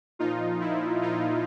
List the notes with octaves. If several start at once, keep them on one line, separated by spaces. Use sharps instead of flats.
A#2 F3 D#4 F4
E4
D#4 F4